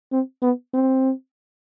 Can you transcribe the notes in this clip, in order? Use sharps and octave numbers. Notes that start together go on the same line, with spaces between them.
C4
B3
C4